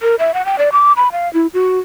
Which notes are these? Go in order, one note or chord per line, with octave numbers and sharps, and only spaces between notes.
A#4
E5
F#5
G5
D5
D6
B5
F5
E4
F#4